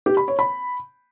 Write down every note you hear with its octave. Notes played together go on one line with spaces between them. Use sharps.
G4
B5
C#5
B5